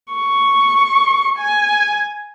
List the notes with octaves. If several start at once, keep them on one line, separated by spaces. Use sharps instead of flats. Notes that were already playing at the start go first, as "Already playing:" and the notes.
C#6
G#5